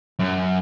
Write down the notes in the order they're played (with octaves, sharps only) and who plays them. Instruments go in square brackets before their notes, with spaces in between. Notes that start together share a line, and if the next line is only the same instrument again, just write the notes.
[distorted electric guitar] F#2